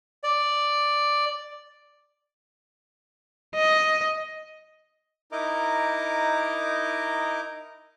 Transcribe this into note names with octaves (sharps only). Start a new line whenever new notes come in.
D5
D#5
D#4 E4 A#4 D#5 A#5 D6